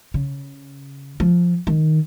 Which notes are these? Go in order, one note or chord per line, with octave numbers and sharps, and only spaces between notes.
C#3
F3
D#3